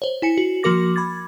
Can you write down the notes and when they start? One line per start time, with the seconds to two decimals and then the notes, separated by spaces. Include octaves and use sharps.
0.02 C5 C#5
0.22 E4 G#5 C#7
0.38 F#4
0.63 F3 A#3 F#4 A#4 D6 A#6
0.96 B5 D6 G#6 A6